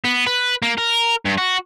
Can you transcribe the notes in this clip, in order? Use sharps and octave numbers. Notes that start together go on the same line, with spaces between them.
B3
B4
A#3
A#4
G2
F#4